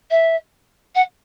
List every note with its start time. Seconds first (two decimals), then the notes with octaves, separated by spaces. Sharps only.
0.11 E5
0.95 F#5